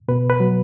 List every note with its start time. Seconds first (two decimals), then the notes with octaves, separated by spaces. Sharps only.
0.08 B2 B4
0.30 B4
0.40 F#3